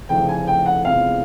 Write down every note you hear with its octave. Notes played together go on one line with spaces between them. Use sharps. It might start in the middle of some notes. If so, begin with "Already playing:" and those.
F1 F2 C#3 E3 A3 G5
G#5
G5
F#5
F1 E2 C3 F3 G#3 F5